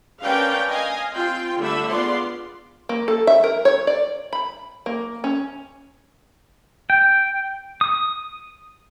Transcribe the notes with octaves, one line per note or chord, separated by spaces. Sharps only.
C#4 D4 A#4 B4 F5 G5
D#5 F5 G#5
C4 F4 G5 C6
D3 G3 A3 D4 E5 B5
G#3 B3 F4 D5 C6
A#3
A4
E5
A#4
C#5
D5
B5
A#3
C#4
G5
D#6